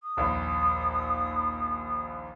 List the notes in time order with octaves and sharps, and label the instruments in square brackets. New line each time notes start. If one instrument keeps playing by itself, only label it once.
[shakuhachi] D#6
[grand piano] A#1 D#2